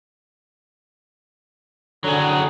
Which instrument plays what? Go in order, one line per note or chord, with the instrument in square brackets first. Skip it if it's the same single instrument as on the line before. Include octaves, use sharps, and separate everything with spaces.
[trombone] D3 [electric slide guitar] F#3 G#4